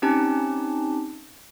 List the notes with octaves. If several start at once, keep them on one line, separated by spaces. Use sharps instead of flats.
C4 C#4 D#4 G4 A5